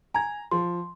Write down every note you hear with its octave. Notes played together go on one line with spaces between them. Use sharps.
G#5 A#5 G#6
F3 C6